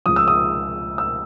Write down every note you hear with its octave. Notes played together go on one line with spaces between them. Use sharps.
C#2 C#3 F3 D#6
E6
D#6
E6